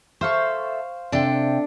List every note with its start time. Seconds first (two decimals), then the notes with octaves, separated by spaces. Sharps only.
0.21 A4 C5 E5 F5 C#6
1.12 C3 D4 A4 G5